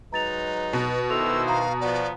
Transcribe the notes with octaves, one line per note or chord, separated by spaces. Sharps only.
F#3 G#3 D#4 B4 A#5 A6 F7
B2
D#3 E4 A4 C5 E6 F7
F5 A#5 D#6
F3 B3 D5